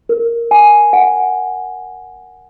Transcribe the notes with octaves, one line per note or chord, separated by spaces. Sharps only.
A#4
G#5
F#5